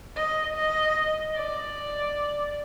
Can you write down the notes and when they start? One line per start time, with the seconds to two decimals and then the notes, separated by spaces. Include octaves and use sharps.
0.16 D#5
0.55 D#5
1.36 D5